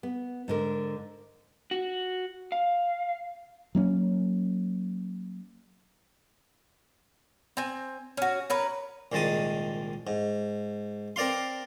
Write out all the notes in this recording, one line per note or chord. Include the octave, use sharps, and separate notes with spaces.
B3
G#2 D3 A#4
F#4
F5
F#3 A#3 C#4
C4 G#5
C#4 F#4
C#4 A#4 B4
C2 A#2 D#3 G#3 A5 D#6
G#2
C4 A#4 D5 F5 C6